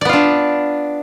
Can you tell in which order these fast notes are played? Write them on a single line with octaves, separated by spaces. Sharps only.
D5 B3 F4 D4